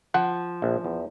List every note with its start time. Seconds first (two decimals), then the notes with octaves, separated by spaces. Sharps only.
0.14 F3 F#5
0.62 A#1
0.84 E2